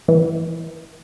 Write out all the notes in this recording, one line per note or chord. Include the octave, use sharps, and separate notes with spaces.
E3